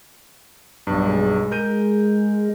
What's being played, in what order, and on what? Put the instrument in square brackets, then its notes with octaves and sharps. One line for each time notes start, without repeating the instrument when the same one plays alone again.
[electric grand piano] B1 G2
[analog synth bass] G#3
[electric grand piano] A#4 G6 D#7